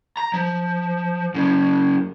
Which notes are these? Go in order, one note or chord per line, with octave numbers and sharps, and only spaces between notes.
A#5
F3
F#2 C#3